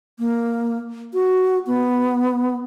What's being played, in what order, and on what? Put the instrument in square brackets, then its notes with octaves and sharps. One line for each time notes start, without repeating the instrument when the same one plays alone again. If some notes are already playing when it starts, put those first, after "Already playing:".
[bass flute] A#3
F#4
B3